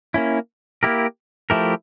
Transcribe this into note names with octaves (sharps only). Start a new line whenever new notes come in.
A#3 C#4 E4
A#3 E4 G4 A#4
F3 A3 E4 G4 A#4